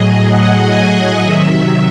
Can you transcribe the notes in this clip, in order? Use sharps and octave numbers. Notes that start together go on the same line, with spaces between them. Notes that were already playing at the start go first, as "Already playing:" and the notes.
Already playing: A2 F#3 G#4 D#5
F#5
G#5
F#5
C3 D#3 F#3 E5